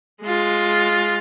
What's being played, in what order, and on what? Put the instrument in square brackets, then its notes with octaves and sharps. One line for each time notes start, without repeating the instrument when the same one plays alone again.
[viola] G#3 F4